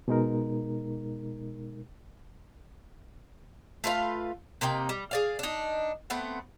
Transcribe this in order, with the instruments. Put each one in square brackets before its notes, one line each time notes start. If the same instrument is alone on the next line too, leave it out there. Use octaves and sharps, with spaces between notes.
[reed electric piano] B2 G#3 D#4 A#4
[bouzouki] A3 F4 B4 F5
C3 A#3 D#4 G5
G3
G#4 D5 F5
D4 D#4
A3 B3 C4 F#5